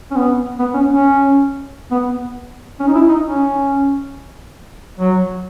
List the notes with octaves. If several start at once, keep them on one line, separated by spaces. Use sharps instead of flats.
C#4
B3
B3
C#4
C#4
B3
C#4
D#4
E4
D#4
C#4
F#3